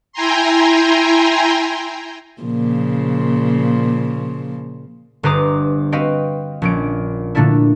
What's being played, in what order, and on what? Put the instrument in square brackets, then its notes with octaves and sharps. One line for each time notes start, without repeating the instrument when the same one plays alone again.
[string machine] E4 G5 G#5 A#5 C6
[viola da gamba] A#2 C#3 F3
[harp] G1 B4 C5 A#5 D6 D#6
C4 F#4 B4 D#5 F5 G5
A#1 C#4 D7
A#2 D3 A3 A#3 D4 E4